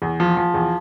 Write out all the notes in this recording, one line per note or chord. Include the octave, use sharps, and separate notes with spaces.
E2
F3
F3
E2